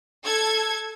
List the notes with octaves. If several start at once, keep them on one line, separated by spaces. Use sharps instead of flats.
A4 G#6